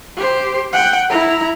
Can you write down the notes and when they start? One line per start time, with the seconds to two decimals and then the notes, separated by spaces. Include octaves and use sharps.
0.16 G4 C5
0.73 F#5 G5
1.10 E4 A#5